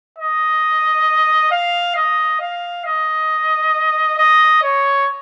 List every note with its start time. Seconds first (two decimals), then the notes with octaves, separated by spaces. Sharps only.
0.19 D#5
1.52 F5
1.96 D#5
2.41 F5
2.85 D#5
4.18 D#5
4.63 C#5